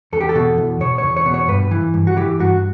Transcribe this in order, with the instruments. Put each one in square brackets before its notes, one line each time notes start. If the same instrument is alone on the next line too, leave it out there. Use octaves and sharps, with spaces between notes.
[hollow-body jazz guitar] E2 A4
G4
A4
B2
E2
B2 C#5
C#5
E2
C#5
B2
C#5
G2 B4
E3
G2
F#4
E3 G4
G2 F#4